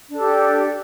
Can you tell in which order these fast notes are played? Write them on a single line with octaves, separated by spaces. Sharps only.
D4 A4 G4